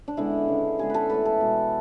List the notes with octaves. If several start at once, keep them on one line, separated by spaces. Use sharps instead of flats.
D4
D3 G#3 B3 E4
C#3 G#3 B3
D3 G#3 B3 G#4
A4 B4
A2 E3 A3 B4
A4
B2 G#3 B3